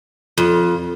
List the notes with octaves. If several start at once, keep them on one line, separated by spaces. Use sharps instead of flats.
F2